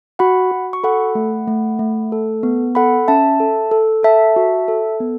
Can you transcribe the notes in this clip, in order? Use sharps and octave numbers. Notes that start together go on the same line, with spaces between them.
F#4 F#5 B5
F#4
C#6
A4 F#5 B5
A3
A3
A3
A4
B3
A4 F#5 B5
C#4 E5 A5
A4
A4
A4 E5 A5
F#4
A4
B3